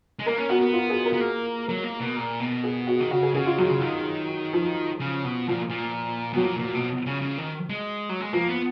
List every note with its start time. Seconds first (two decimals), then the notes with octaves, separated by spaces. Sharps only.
0.19 G#3
0.26 A#3 A#4
0.38 C#4
0.49 B3 F#4
0.61 B3
0.73 F4
0.90 G#4
1.05 A#4
1.13 B3
1.21 A#3
1.68 F#3 A#4
1.84 A#3
2.00 B2
2.16 A#2
2.40 B2
2.64 G#4
2.87 F#4
3.00 D#3
3.11 C#3 F#4
3.23 G#4
3.34 C#3 G#4
3.46 F4
3.58 D#3 F#3
3.69 C#3
3.81 D#3
4.53 F3
5.00 C#3
5.25 B2
5.48 A#2 F3
5.70 A#2
6.33 B2 F#3
6.43 A#2 F3
6.59 A#2
6.75 B2
7.06 C#3
7.22 C#3
7.38 D#3
7.70 G#3
8.09 F#3
8.20 G#3
8.33 F3 A#3
8.48 B3